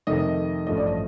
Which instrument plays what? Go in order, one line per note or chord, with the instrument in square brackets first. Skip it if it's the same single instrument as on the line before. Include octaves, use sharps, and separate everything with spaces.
[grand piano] F2 C3 D#3 A3 D#5
A1 G2 F3 A3 D#5
D5
D#5